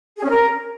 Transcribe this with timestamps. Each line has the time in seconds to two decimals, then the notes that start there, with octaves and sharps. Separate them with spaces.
0.18 G#4
0.24 C#4
0.30 A#4